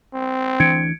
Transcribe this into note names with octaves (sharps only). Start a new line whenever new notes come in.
C4
D2 E3 D4 G#6 C#7 D7